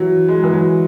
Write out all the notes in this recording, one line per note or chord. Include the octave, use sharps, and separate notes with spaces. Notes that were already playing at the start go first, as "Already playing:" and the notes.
Already playing: E3 F#3
G#3
E3
F#3